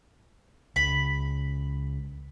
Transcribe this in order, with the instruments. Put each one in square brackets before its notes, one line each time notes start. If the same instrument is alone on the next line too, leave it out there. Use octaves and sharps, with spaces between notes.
[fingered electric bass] C#2 [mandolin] B5